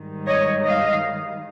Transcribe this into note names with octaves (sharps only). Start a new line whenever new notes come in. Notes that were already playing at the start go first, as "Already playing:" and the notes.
Already playing: G#2 D#3 G3
C#5 D#5
D#5 F5